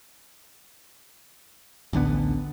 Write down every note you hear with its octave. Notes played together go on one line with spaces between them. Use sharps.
A1 D2 D3 B3